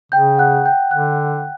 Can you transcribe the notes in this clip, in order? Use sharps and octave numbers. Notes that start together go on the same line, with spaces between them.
C#3 G5 G6
F#5 F#6
G5 G6
D3 F#5 F#6